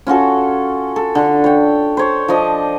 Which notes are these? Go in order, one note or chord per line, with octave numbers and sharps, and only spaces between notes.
C#4 F4 F#4 A4
A4
D3
C#5 G5
C5 C#5
F3 D4 D#5 D6